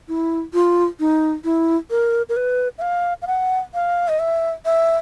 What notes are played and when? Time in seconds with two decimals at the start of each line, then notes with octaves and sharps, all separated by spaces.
0.08 E4
0.54 F4
1.00 D#4
1.44 E4
1.90 A#4
2.29 A#4
2.36 B4
2.78 E5
2.82 F5
3.22 F5
3.27 F#5
3.74 F5
4.08 D#5
4.19 E5
4.65 E5